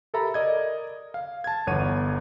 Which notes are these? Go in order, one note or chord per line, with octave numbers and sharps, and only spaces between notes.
G4 A4 A#4 E5 A#5 B5
A#4 D5 D#5 G#6
F5
A5 G#6
G1 E2 C#5 F#5 D#7